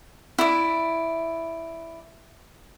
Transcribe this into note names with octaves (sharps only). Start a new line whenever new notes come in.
E4 D5